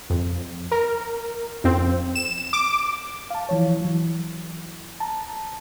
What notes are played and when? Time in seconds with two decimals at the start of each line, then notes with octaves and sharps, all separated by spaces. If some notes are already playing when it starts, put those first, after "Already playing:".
0.10 F2
0.71 A#4
1.64 F2 C4
2.15 E7
2.53 D6
3.30 F5 A5
3.49 E3 F3 C#5
3.81 E3 F#3
5.00 A5 A#5